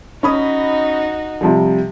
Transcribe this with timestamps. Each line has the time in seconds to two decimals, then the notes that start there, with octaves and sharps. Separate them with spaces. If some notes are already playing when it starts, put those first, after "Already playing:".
0.23 C#4 D#4 F#4 B5 D#6
1.41 C3 F3 G3